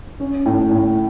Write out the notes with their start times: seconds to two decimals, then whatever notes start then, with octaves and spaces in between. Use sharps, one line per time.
0.20 C#4
0.46 A2
0.71 A2